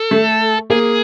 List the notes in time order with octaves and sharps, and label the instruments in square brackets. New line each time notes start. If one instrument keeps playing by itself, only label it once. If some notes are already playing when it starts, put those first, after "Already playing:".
Already playing: [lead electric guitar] A4
[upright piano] A3
[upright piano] A#3 [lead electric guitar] G#4